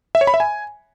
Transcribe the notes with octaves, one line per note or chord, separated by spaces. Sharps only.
E5
C#5
B5
E5
G#5